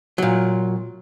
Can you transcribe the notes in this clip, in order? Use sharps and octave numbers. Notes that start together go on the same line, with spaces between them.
A#2 F#3